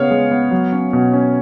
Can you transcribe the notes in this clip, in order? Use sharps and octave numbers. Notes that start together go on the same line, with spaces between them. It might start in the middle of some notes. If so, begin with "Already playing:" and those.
Already playing: C#3 B3 C#5 F5
G#3
B3
F#3
C#4
B2
C#4